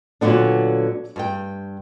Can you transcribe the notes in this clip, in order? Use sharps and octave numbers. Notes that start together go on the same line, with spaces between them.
A#2 D3 F#3 B3 D4
G2 G3 G5